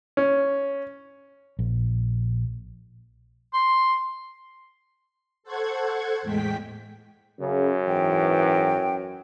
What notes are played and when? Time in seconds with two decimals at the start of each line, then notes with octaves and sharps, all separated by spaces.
0.17 C#4
1.59 A#1
3.53 C6
5.43 A4 C5 F#5 C#6 G#6
6.22 E2 A2 G#3 G5 B6
7.40 F#2 C#3
7.87 G#2 E3 G5